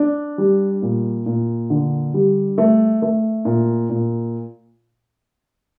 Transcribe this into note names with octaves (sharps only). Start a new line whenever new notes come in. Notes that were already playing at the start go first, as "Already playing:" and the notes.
Already playing: D4
G3
A#2
A#2
D3
G3
A3
A3
A#2
A#2